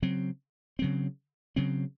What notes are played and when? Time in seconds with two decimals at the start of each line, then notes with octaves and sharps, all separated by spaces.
0.02 C#3 F#3 C4
0.79 C#3 F#3 C4
1.56 C#3 F#3 C4